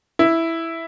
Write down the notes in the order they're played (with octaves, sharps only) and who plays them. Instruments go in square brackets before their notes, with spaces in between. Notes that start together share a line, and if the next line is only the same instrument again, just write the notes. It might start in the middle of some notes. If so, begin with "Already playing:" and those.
[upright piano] E4